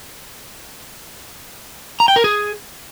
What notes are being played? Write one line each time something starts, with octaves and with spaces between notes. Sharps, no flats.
A#5
G5
A#4
G#4